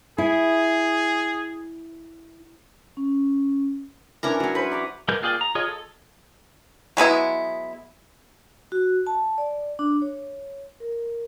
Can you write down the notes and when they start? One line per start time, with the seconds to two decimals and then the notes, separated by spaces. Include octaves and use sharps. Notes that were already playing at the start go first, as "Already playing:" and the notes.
0.18 E4 G#4
2.97 C#4
4.23 E3 C#4 D4 A#4 A#5
4.40 F#3 C#4
4.55 B4 C5 B5 C#6
4.71 D5 A#5 D6
5.08 G3 G#3 A#4 B4 G6
5.22 A#3 F4 G#4 D5 G5
5.41 A#5
5.55 F4 G#4 C#5 D#5
5.68 A4
6.97 F#3 G#3 B3 E4
8.72 F#4
9.07 A5
9.38 D5
9.79 D4
10.02 C#5
10.80 A#4